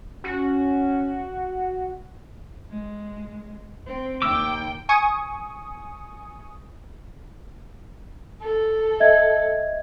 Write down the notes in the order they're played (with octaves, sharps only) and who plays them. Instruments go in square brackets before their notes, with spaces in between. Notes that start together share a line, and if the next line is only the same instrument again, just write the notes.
[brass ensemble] C#4 [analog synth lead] F#4
[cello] G#3
C4
[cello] D#2 G5 [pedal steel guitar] D6 E6
[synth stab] G#5 C#6 D#6
[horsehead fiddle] A4
[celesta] D#5 E5 G#6